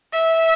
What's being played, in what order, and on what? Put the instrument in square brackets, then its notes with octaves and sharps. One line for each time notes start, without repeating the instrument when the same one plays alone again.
[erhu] E5